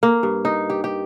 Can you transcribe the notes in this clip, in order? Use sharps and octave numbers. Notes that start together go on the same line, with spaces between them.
A#3
G2
D#4
G4
G4